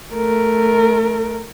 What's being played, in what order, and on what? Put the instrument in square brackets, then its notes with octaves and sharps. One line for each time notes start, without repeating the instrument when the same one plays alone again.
[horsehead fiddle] A3 A#4